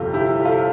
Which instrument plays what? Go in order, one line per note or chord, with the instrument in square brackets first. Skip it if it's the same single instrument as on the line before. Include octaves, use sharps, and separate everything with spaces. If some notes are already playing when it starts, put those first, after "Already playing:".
Already playing: [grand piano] G1 F2 C3 F4 G4 A4
E4 G4
F4 A4